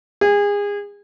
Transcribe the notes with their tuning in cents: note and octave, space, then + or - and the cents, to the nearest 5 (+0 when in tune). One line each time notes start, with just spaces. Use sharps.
G#4 -30